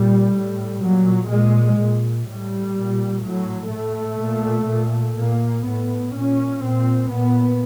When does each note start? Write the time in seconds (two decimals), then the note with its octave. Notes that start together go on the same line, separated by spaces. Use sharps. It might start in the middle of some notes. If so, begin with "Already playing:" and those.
Already playing: A#2 G3
0.34 A2
0.82 A#2 F#3
1.30 A#2 G#3
1.79 A#2
2.27 A2 G3
2.76 A#2
3.24 A2 F#3
3.72 A2 A3
4.21 A#2
4.69 A#2
5.17 A#2 A#3
5.66 A2 B3
6.14 A#2 C#4
6.63 A#2 C4
7.10 A#2 B3